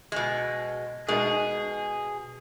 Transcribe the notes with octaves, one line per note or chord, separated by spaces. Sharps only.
B2 G#3
B2 G#3 D#4 G#4